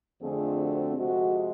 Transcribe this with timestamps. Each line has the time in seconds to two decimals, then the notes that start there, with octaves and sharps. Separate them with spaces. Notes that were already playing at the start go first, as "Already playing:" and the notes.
0.22 F2 D3 F3 A3 C4 G#4
0.59 F#4
0.96 C3 F3 G#3 F#4